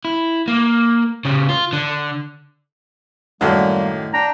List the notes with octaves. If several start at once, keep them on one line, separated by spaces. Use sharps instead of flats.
E4
A#3
C#3 G4
F4
D3
F#2 A2 D3 D#3 G3 A#3
D4 G5 A#5